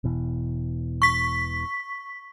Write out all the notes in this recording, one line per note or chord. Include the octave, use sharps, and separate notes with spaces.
E1 B2 E3
C#6 B6